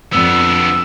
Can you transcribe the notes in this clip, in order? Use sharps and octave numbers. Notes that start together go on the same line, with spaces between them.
F2 B3 D4 E6